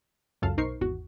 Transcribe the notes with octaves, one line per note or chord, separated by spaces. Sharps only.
C#2 F#2 A4 F5 A5
B1 D#4 A#4 C5 C#6 C7
G#1 E2 F#4